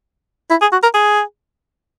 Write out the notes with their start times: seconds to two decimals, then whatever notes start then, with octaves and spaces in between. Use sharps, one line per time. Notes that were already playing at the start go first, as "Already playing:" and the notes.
0.50 E4
0.61 G#4
0.72 F#4
0.83 A#4
0.94 G#4